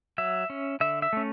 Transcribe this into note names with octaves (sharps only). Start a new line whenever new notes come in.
F#3 E5
C#4
D3 E5
E5
A3 C#4